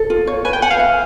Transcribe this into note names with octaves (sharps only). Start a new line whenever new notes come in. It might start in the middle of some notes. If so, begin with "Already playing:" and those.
Already playing: A4
F4
C#5
B4 G#5
G5
F#5 G#5
F5
E5